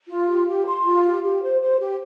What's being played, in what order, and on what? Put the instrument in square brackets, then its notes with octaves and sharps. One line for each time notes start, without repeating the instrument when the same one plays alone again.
[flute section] F4
G4
G4
C6
F4
G4
G4
C5
C5
G4